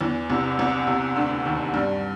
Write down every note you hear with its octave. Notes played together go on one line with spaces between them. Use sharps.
E2 E3
C2 C3
C2 C3
C2 C3
D2 D3
D#2 D#3
G2 G3